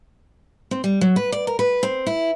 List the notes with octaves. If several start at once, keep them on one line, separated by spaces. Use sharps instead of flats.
C4
G3
F#3
B4
D5
A#4
B4
C4
E4